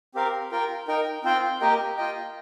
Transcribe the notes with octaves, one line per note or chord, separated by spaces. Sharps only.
C4 G4 A#4 F5
F4 A#4 G5
D#4 A#4 G5
C4 F4 C5 G5
A#3 G4 A#4 D#5 G5
F4 D#5 G5